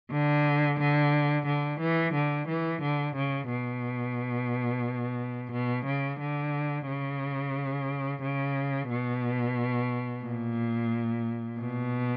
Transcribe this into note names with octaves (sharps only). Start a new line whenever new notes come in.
D3
D3
D3
E3
D3
E3
D3
C#3
B2
B2
C#3
D3
C#3
C#3
B2
A#2
B2